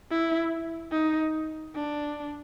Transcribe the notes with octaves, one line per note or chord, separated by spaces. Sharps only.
E4
D#4
D4